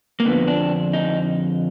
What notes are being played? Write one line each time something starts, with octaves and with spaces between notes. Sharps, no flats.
A#3
F2 D3 B3
D4
D#4